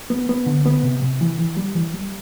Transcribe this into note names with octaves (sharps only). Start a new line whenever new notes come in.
B3
B3
D3
B3
C3
C3
E3
E3
G3
E3
G3